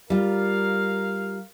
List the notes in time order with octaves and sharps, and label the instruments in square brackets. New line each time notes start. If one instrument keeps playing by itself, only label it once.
[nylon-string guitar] G3 F4 [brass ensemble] A#4 F5